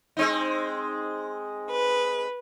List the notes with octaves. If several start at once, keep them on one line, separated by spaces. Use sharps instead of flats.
G#3 C4 D#4
B4